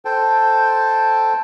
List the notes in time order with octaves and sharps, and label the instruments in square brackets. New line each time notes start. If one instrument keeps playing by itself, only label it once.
[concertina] A4 C5 G5 A5